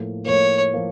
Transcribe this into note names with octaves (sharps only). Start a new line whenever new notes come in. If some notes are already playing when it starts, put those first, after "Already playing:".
Already playing: A2 F3 A#3
A2 F3 A#3 C#5
F3 A#3